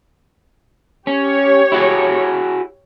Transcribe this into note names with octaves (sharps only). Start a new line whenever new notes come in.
C#4 G4 C#5
E4 F#4 G#4